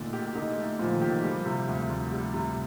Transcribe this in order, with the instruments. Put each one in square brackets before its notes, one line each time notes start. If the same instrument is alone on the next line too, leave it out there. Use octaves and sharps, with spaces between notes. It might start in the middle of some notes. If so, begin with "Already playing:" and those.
Already playing: [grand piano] A#2 A3 D#4 [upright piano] D3
[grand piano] G4
[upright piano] D3 [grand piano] D#4
[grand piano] A3
[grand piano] A#2 [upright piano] F3
[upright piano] D#3
[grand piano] G4
[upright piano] D#3
[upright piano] F3 [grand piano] G3
[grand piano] C3
D2
D2
G3
C3